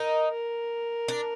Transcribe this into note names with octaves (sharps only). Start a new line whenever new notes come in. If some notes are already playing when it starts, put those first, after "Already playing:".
Already playing: D#4 A#4
A#4
D4